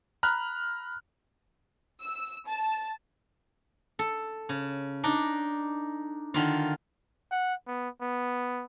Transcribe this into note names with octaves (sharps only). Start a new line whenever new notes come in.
A#5 B5 F6 F#6
E6
A5
A4
C#3
D4 D#4
D3 D#3 F4
F#5
B3
B3